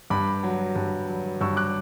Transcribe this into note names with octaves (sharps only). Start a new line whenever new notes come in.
G2 B5 D6
F#3
G2
F#3
G2 C#6 E6
D6 F#6